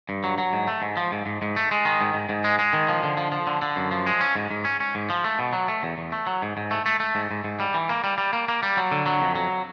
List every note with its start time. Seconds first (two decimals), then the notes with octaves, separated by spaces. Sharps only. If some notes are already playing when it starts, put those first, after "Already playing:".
0.09 G2
0.24 F#3
0.38 F#3
0.53 G#2
0.68 A3
0.82 G#2
0.97 F3
1.12 G#2
1.26 G#2
1.42 G#2
1.56 A3
1.71 G#3
1.85 D#3
2.01 G#2
2.14 G#2
2.29 G#2
2.44 G#3
2.59 G#3
2.73 D#3
2.88 F3
3.03 D3
3.17 F3
3.32 F3
3.47 D3
3.62 D3
3.76 F#2
3.91 F3
4.06 G#3
4.21 C#4
4.36 G#2
4.51 G#2
4.65 C#4
4.80 C#4
4.95 G#2
5.10 F3
5.24 A3
5.39 B2
5.53 F#3
5.68 A3
5.83 E2
5.98 E2
6.12 A3
6.27 F#3
6.42 G#2
6.57 G#2
6.71 A3
6.86 A3
7.00 A3
7.15 G#2
7.31 G#2
7.44 G#2
7.60 G3
7.74 E3
7.89 A#3
8.04 G3
8.18 G3
8.33 A#3
8.48 A#3
8.63 G3
8.77 F#3
8.91 D3
9.06 F#3
9.22 F2
9.36 F#3